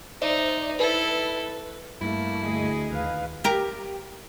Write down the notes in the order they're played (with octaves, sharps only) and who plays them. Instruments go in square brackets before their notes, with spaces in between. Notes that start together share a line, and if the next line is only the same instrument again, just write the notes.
[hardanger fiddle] D#4 [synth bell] C5 D5 E5
[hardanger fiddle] E4 A4 [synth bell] B4
[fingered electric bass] G2 [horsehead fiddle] A3 A#3 [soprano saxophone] E4
[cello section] D2 G#4 D#5
[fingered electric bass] D#2 [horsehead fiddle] B4 F5
[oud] G4 A#4